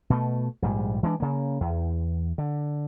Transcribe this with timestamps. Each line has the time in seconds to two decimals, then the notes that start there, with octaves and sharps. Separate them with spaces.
0.10 B2 A3
0.62 A#1 G#2 G3
1.03 E3 G#3 C4 D4
1.20 C#3 A#3
1.61 E2
2.38 D3